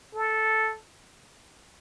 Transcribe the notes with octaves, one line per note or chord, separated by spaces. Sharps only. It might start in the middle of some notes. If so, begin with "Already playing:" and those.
A4